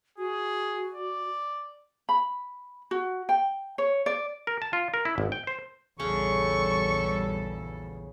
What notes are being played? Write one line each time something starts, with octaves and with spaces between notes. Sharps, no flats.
F#4 G#4
D5
B5
F#4
G5
C#5
D5
A#4
A5
F4
A#4
E4
G#1
G5
C5
A#1 E2 C#3 G3 C#4 A4 C#6